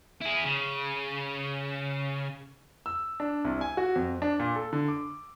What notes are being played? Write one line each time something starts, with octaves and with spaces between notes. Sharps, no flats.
E4 G#4
C#3
E6
D4
C2
G#5
F#4
F2
D4
A#2
A4
D3
D6